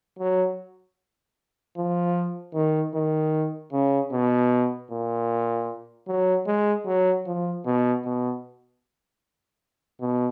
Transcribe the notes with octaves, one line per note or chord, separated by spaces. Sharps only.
F#3
F3
D#3
D#3
C#3
B2
A#2
F#3
G#3
F#3
F3
B2
B2
B2